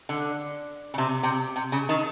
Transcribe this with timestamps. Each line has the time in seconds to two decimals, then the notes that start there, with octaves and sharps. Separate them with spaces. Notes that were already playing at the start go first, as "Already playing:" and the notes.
0.09 D3
0.94 C#3
0.98 C3
1.23 C3
1.56 C3
1.72 C#3
1.89 D#3